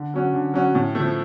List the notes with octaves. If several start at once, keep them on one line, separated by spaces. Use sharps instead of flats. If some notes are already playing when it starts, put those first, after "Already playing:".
Already playing: D3
F#3 C#4 F#4
D3
F#3 C#4 F#4
A2
F3 A3